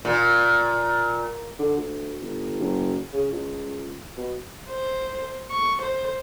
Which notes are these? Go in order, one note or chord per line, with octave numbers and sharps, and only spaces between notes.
A#2
D3
D2
G1
F#1
C#3
C#2
B2
C5
C#6
C5